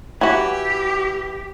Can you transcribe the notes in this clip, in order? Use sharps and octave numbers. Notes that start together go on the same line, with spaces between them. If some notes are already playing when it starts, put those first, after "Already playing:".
E3 F#4 G4